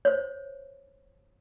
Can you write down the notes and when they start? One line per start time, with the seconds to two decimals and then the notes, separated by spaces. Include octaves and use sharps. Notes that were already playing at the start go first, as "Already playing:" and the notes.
0.05 C5 C#5